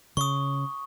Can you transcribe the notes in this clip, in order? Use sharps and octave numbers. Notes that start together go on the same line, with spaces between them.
C#3 C#6 D#6